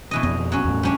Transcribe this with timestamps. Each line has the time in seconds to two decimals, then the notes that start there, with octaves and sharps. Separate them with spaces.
0.11 B2 E3 D#5
0.23 F2 B3 D#5
0.52 F#3 C#4
0.64 E2 A2
0.83 G3 C#4 D4